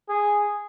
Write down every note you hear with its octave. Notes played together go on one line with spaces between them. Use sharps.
G#4